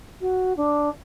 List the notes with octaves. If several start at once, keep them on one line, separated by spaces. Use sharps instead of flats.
F#4
D4